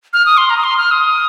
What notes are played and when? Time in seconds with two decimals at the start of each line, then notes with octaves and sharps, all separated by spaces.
0.13 F6
0.26 D#6
0.37 C6
0.50 A#5
0.57 D#6
0.64 C6
0.78 F6
0.91 D#6